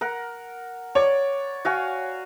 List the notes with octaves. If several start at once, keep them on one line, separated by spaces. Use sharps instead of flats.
A#4 F#5
C#5 D5
F#4 F5 G#5